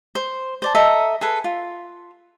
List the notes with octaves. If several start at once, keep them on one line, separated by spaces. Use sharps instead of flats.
C5
C5 D5 A5
A4 D#5 E5 A#5
G#4 A4 B4
F4